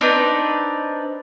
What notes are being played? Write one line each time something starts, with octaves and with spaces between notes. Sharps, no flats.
C4 D4 D#4 B4